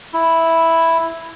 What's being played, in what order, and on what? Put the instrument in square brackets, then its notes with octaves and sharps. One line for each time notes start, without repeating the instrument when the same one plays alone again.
[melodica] E4